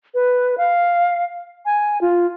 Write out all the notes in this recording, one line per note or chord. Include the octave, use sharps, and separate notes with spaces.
B4
F5
G#5
F4